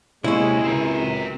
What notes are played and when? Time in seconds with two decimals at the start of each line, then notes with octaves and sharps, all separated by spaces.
0.24 D#2 C3 G#3 A#3 C#4 E4
0.63 C#2 F#2 C4 A#5